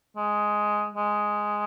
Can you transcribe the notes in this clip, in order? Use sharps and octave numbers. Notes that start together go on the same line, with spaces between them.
G#3
G#3